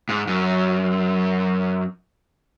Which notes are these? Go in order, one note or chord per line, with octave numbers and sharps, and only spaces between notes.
G#2
F#2